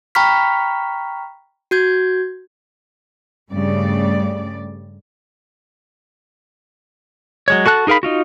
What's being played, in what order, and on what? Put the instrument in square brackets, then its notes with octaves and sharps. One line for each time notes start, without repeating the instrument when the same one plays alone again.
[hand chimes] G5 A#5 B5 C#6 F6 B6
F#4 G6 G#6
[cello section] G2 C#3 G3 A3 D5
[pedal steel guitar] F#3 G#3 C#5
F#4 A4 A5 F#6
D#4 G#4 A#4 F5 B5
D#4 F4 F#4